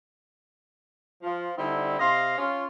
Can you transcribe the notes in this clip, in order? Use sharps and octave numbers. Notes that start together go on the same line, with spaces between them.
F3
D3 G3 C4 D#4 E4
C3 D#5 F5 C6
C#4 F4